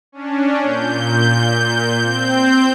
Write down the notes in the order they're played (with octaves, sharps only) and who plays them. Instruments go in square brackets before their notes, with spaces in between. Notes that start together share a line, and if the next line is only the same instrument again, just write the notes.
[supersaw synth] C#4 D4
A#2 G6
C4 G6